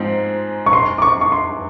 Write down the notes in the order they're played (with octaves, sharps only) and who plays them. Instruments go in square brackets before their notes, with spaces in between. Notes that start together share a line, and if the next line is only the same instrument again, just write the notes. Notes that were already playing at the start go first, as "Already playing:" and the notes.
Already playing: [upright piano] G#2 F3 G#3 C4 D#4
[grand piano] C#6
C6
D6
C#6
C#6
C6